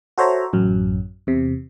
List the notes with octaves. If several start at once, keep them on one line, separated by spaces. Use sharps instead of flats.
F#4 A4 C5 C#5 E5 A#5
A1 F#2 F#3
E2 C3